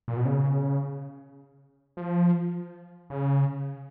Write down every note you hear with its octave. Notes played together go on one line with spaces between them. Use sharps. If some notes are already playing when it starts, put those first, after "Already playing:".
A#2
B2
C#3
F3
C#3